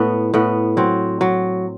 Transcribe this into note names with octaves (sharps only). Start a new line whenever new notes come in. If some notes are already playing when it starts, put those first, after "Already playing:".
Already playing: A2 B3
A2 B3
F#3 C4
F#3